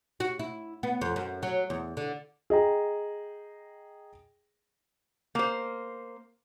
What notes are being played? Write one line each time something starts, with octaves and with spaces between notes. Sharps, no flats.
F#4
E4
B3
F2
F#2
F#3
E2
D3
G#4 D#5 G5 A#5
A#3 C5